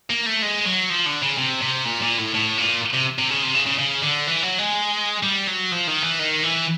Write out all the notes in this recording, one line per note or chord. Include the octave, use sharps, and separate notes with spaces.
A#3
A3
G#3
F#3
F3
D3
C#3
C3
C3
A#2
A#2
A2
A2
A#2
C3
C3
C#3
C3
C#3
C#3
C#3
D3
E3
F#3
G#3
G3
F#3
F3
D#3
E3
D#3
E3